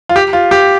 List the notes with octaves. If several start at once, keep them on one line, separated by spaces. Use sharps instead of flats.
F4
G4
F4
G4